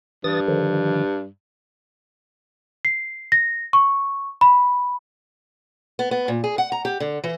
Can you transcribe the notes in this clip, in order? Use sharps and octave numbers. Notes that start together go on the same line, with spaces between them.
G2 E3 D#6 A6
D3 D#3 F3
C7
A#6
C#6
B5
B3
B3
A#2
G#4
F#5
A#5
G4
D3
E3